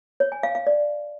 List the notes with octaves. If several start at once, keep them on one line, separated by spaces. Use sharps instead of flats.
C#5
G#5
F5
F5
D5